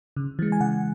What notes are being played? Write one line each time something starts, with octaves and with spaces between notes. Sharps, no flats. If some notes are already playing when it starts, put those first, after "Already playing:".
C#3
E3 G#3
G#5
C#3 F#5